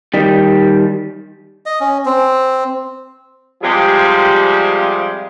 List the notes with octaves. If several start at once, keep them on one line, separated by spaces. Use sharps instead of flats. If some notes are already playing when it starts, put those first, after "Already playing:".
D#3 G3
D#5
C#4
C4
C3 F3 G3 G#3 G4 G#4